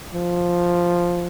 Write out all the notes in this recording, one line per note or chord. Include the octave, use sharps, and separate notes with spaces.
F3